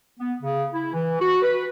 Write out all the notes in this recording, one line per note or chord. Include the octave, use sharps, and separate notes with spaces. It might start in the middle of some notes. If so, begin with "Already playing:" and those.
B3
C#3
E4
E3
F#4
B4